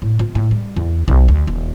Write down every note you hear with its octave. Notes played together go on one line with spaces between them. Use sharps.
A2
F4
A2
G3
E2
B1
D2
D#1